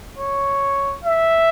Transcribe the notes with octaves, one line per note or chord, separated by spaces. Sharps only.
C#5
E5